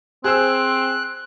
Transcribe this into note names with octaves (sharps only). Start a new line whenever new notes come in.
C4 G#4 C5 E6 F#6